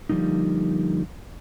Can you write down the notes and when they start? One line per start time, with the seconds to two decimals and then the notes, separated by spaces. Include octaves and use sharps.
0.10 D3 F3 G3 A#3 D#4